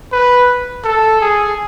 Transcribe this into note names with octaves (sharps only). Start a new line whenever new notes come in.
B4
A4
G#4